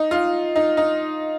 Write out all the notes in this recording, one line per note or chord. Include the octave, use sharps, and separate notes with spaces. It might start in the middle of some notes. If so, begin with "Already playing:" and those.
Already playing: D#4
F4
D#4
D#4